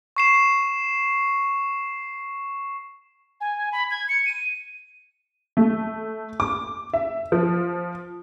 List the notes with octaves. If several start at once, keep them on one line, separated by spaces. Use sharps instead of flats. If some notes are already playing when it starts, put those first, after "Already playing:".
C#6 C7 E7
G#5
B5
G#6
C#7
D#7
A3
D6
E5
F3